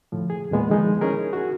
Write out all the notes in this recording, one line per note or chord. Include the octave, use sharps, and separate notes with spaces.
A2 D3 F3
G#4
E2 A#2 G#3 B3
D3 D#3 F3 G#3 B3 D#4
C#4 D#4 E4 G#4 A#4
F#4 G#4